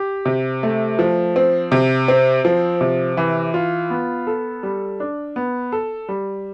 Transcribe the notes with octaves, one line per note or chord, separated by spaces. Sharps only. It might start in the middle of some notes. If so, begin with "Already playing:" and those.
Already playing: G4
C3
A3
F3
C4
C3
C4
F3
C3
E3
F4
B3
A4
G3
D4
B3
A4
G3